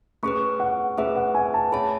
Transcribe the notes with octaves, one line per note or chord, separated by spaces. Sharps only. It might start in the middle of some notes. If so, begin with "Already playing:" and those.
A3 C#4 G#4 B4 C#6
F#5
A3 C#4 G#4 B4 E5
F#5
G#5
A5
G#4 C#5 E5 A5 B5